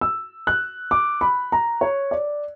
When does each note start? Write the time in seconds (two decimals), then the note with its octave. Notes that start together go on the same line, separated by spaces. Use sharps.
0.01 E6
0.47 F#6
0.91 D6
1.21 B5
1.52 A#5
1.81 C#5
2.11 D5